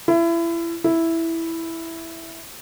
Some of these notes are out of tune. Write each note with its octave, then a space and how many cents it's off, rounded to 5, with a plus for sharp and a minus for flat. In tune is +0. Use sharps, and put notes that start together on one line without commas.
E4 +30
E4 +0